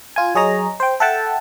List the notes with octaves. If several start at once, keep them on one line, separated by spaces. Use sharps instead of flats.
F4 G#5
F#3 G#4 C#5 D#5 A#5
C5 G5
A4 E5 F#5 G5 A5